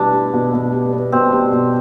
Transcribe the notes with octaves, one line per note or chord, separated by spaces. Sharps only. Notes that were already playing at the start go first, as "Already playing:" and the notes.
Already playing: B2 G3 B3 D4 E4
G3
B2
B2
G3
B3
B2 C4
G3
B2